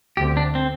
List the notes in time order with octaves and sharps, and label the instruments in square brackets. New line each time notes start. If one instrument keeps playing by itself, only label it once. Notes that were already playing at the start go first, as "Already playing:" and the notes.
[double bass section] D2 D3 C4 [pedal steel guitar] G4
[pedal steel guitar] D4
C4